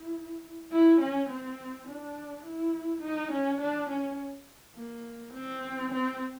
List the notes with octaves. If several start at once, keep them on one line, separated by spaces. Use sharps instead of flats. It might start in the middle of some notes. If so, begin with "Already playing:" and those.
Already playing: E4
E4
C#4
C4
D4
E4
D#4
C#4
D4
C#4
A#3
C4
C4